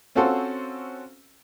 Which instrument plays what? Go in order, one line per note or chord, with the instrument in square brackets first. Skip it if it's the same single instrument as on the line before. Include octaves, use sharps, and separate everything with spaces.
[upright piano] C4 C#4 F4 F#4 A4 C5